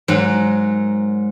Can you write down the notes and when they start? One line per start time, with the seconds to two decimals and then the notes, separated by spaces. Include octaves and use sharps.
0.08 G#2 F#3 A#4